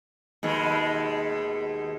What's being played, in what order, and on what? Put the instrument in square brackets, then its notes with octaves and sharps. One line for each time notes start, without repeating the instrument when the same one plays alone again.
[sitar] D#2 B2 G#3